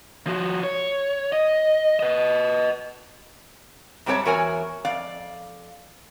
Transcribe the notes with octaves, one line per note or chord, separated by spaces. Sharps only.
F3 F#4
C#5
D#5
B4 D#5
G#2 G3 C4 G4 C#5 A5
E2 F#4 A#4 C#5 G#5 A#5
F2 D5 F5